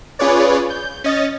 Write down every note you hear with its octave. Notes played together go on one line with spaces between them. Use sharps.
C#4 F4 G#4 B4 C#5 D5
G6
C#4 D#5 A6